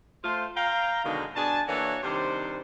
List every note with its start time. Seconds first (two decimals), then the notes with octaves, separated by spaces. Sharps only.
0.24 A3 F4 C5
0.56 F5 G5 A#5
1.05 B2 D3 D#3 F#3 G#3 D#4
1.36 B2 D4 G#5 A5
1.68 E3 A#3 D4 F#4 A4 C#5
2.03 C3 D#3 G3 D4 C5